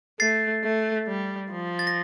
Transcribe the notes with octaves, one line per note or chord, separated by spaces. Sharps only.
A3 A6 C7
A3
G3
F3
A6
A#6